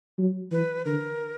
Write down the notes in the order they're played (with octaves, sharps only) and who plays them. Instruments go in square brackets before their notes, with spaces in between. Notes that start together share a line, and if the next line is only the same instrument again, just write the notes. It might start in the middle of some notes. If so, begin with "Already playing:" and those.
[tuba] F#3
[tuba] E3 [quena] B4
[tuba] D3 [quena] A#4